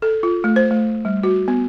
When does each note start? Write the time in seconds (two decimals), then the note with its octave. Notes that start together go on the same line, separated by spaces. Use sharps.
0.02 A4
0.23 F4
0.44 A3
0.56 C5
0.71 A3
1.05 G3
1.23 F#4
1.48 B3